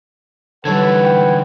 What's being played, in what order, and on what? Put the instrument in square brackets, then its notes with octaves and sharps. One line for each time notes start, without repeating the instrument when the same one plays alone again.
[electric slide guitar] D3 E3 [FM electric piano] G3 C#5 G#6 [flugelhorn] A4 [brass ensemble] B4 F#5
[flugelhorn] G5